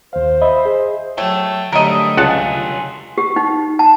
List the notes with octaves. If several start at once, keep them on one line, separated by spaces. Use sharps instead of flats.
D#2 C5 F5
D#5 E5 B5
G#4
F#3 A3 A4 C#5 G5
D3 F#3 G3 A3 A#4 D#5
C#2 F4 F#5 G#5 A5
G4
D#4
A5